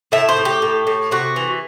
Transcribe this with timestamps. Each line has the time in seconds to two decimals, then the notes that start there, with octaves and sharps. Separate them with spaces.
0.12 A2 E5
0.29 C5
0.37 A2
0.45 G4
0.62 A2
0.87 A2
1.11 C3 F#4
1.36 E3